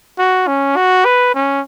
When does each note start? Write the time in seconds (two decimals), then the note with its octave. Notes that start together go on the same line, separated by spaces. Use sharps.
0.18 F#4
0.47 C#4
0.76 F#4
1.05 B4
1.35 C#4